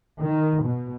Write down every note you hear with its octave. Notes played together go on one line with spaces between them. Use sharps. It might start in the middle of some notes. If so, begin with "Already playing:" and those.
D#3
B2